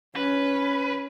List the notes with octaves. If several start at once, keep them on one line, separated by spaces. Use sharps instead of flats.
C#4 B4